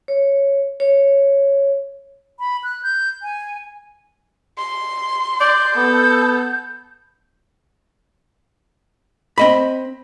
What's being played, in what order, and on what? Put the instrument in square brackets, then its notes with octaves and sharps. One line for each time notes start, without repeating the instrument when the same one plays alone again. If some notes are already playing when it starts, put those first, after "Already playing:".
[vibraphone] C#5
C#5
[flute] B5
F#6
G6
G#5
[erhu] C6
[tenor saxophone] D5 [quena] G6
[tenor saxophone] B3 [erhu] A4
[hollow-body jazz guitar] C4 D#5 B5